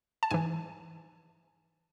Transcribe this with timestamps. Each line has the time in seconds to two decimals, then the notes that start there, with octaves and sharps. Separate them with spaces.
0.23 A5
0.31 G#2 E3 G#5